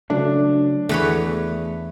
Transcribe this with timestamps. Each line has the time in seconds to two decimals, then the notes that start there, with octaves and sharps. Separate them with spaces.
0.10 C#3 F#3 A3 D4
0.89 E2 A3 B4 C#5